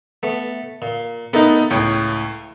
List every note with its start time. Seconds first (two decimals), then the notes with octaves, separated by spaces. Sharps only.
0.23 A3 B3
0.82 A#2
1.33 A3 B3 D#4 A4 A#4
1.71 C#2 A2 C#5 G5